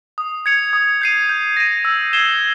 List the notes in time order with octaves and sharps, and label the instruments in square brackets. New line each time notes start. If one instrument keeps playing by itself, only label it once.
[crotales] D#6
G#6 C#7 F7
D#6
G6 C7 D#7
G6
A#6 D#7
E6
G#6 C7 E7 G7